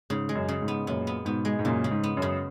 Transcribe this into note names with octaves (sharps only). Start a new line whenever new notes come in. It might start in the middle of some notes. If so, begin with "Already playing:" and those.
G#2 C#3
G#3
F#2
C#3
G#2
B3
F#2 A#2 B3
B3
G#2 B2 B3
G#3
G#2
F#2 A#2 C#3
C#3
G#2
B3
F#2
C#3